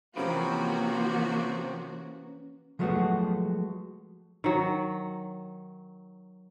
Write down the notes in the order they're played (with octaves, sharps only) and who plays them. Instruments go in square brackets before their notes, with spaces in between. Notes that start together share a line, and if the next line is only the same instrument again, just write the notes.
[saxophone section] C3 F3 [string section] E3 A#3 F#4 [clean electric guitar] C#4 A#4 B4
[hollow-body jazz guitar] F3 F#3 G#3 A3 B3 F#4
[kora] D#3 F#3